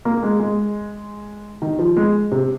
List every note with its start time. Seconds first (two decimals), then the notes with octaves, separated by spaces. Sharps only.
0.05 A#3
0.23 G#3
0.40 G#3
1.62 D#3
1.79 F3
1.97 G#3
2.32 C3